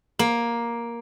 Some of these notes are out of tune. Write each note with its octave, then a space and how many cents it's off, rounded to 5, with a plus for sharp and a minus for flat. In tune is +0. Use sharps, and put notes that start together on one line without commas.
A#3 +10